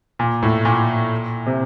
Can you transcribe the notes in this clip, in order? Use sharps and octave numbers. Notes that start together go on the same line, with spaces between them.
A#2
A2
A#2
C3